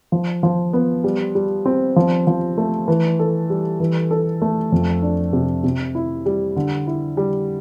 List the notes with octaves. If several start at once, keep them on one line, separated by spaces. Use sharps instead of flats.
F3
F3
B3
G3
G3
C4
F3
F3
A3
E3
A4
G3
E3
A4
A3
F2
D4
C3
C3
E4
G3
D3
E4
G3